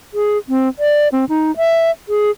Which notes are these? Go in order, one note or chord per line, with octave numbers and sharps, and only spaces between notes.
G#4
C4
D5
C4
D#4
E5
G#4